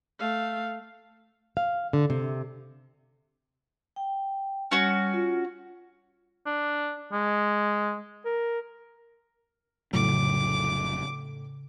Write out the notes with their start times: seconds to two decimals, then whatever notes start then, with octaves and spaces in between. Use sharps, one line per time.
0.19 A3 F5
1.57 F5
1.93 D3
2.10 C3
3.96 G5
4.72 G3 C#4 F#4
5.14 F4
6.46 D4
7.12 G#3
8.25 A#4
9.93 F1 A2 C#3 F#3 D6